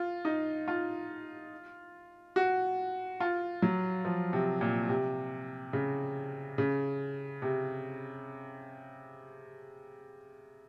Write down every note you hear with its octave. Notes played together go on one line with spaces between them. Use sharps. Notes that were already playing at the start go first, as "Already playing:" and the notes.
Already playing: F4
D#4
F4
F#4
F4
F#3
F3
C3
A#2
C3
C#3
C#3
C3